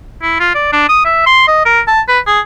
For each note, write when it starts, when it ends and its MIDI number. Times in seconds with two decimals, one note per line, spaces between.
0.22 0.37 64
0.40 0.50 65
0.55 0.68 74
0.73 0.87 62
0.89 1.00 87
1.05 1.23 76
1.26 1.43 84
1.48 1.62 75
1.66 1.81 70
1.88 2.01 81
2.08 2.19 71
2.26 2.40 68